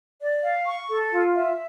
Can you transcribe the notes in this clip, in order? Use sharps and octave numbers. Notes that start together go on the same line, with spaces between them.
D5
F5
C#6
A4
F4
E5